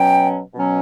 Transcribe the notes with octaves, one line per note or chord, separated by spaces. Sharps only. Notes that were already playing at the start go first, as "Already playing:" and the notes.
Already playing: B2 F#3 C#4 G5
B2 F#3 C#4